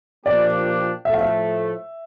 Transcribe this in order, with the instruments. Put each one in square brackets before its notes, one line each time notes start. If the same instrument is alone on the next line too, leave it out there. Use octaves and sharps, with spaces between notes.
[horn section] A#2 F3 A#3 D4 G4 [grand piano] D5
[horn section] A2 F3 A3 [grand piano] E5
[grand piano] F5
E5